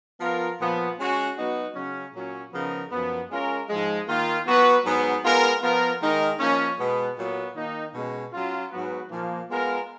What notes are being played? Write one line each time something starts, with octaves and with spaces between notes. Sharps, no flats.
F3 B3 F4 A#4
A#2 F3 B3
G#3 C#4 F#4
F#3 B3 D#4 F#4
C#3 F#3 C#4
A#2 F#3 C#4
C#3 F3 B3 D#4 A#4
F#2 F3 B3
G#3 C#4 F4 A#4
G#2 F3 G#3
D#3 A#3 F4
F#3 B3 F#4 B4
G#2 F#3 B3
G#3 B3 F4 A#4
F3 B3 F4 A#4
D#3 G#3 D#4 A#4
F3 A#3 C#4
B2 G#3 B3
A#2 F#3 B3
D#3 A#3 D#4
B2 G#3 C#4
F#3 C#4 F4
G#2 F#3 B3 F#4 B4
A#2 F3 A#3
G#3 B3 F4 A#4